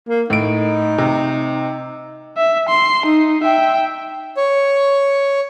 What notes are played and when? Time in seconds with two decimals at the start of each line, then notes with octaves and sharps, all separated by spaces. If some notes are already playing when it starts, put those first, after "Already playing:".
0.08 A#3
0.30 A2 D#4 D7
0.98 C3
2.37 E5
2.68 C6
3.05 D#4
3.43 E5 G5
4.37 C#5